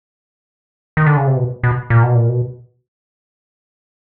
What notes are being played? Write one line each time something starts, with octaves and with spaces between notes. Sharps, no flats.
D#3
D3
C#3
C3
B2
B2
A#2
B2
A#2
B2